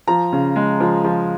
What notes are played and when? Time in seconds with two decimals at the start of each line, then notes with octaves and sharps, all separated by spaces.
0.07 F3 A#5
0.32 C#3
0.56 G#3
0.80 F3
1.04 F3